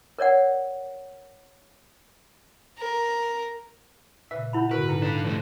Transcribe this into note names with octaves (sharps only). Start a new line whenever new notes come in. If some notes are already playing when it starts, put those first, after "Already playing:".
A#4 C#5 D5 F#5
A#4
A#2 C#3 B4 E5
E4 F#5 B5 G6
G#2 D3 F#4 A#4 B4
D#4 A4 A#5
D4 B4
F3 A3 C4